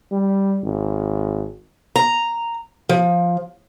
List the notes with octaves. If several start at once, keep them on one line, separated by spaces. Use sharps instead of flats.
G3
G#1
A#5
F3